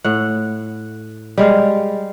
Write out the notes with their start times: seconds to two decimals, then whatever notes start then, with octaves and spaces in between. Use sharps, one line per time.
0.04 A2 F#5
1.38 G3 G#3 F5